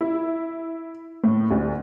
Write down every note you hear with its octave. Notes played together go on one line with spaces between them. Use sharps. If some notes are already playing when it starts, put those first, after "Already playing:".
E4
A2
D2